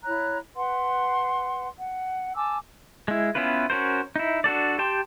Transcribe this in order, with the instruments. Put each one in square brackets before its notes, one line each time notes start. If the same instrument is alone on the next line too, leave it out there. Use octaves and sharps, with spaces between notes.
[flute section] E4 C#5 A#5 F#6
B4 F#5 C6
F#5
G#5 A5 D6 E6
[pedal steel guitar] G#3 E4
B3 C#4 E4 F4 B4
C#4 F#4 A#4 C5
D#4 E4
D4 F#4 A4 D5
G4 G5 A5 C6